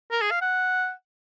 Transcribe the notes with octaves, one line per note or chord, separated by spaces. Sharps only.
A#4
G#4
F5
F#5